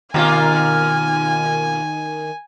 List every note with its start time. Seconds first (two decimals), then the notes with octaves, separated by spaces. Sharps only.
0.14 B2 D#3 A#3 F4 G#5